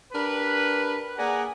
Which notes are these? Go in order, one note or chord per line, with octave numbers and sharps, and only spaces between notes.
D4 G4 A#4 B4
A#3 G#4 D5 F#5 G#5 A#5